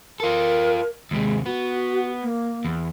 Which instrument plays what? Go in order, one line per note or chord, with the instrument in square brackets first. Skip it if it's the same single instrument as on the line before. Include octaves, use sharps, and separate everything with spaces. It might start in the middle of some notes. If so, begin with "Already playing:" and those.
[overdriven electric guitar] F4 A4 [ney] A#4
[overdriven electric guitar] D#2 C3 [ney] G#3
[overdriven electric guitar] B3 [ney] F#4
[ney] A#3
[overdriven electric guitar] E2